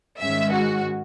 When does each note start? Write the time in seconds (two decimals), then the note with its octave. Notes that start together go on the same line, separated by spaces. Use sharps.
0.20 G#2 D#3 G#3 C#4 E5
0.52 F#4